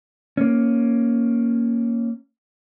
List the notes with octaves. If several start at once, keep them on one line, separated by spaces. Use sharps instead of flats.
A#3 C#4